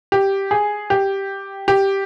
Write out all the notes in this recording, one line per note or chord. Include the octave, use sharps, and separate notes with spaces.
G4
G#4
G4
G4